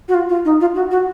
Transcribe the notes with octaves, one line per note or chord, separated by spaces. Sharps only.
F#4
F4
F4
D#4
F4
F#4
F#4